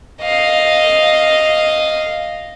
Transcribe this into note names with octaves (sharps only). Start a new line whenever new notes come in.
D#5 F5